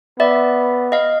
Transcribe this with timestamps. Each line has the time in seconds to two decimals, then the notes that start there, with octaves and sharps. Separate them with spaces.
0.20 B3 D5 E5
0.92 D#5 F5